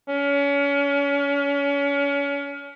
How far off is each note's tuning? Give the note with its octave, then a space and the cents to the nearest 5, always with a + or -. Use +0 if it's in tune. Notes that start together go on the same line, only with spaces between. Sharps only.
C#4 +35